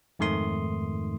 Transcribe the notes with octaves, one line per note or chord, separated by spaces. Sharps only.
F2 G#2 D#3 A3 C6 D#6